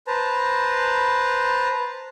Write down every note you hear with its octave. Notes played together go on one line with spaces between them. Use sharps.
B4 C5 A5 A#5